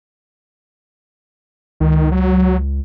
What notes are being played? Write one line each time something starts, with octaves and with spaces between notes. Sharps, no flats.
C#2 D#3
F#3